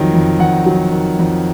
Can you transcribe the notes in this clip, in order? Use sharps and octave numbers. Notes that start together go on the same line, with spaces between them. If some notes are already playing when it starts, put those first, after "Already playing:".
Already playing: F2 D#3 F#3
F2
F2 F#5
F#3
D#3
F2